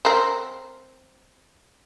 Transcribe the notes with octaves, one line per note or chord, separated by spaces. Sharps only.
C4 A#4